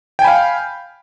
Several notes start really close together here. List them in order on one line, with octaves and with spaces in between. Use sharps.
G5 G#5 B5 F5